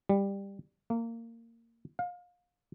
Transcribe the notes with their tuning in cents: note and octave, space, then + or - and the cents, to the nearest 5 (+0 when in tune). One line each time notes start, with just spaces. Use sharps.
G3 +15
A#3 -20
F5 +30